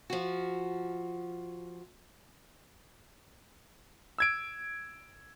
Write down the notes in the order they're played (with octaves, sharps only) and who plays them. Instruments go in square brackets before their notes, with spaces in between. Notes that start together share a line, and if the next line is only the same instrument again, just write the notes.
[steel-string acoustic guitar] F3 F#4
[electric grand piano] E6 G#6 D7